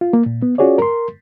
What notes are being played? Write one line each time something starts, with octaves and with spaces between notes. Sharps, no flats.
F4
A#3
A#2
B3
C#4 F4 F#4 G#4 C#5 D5
A#4 C6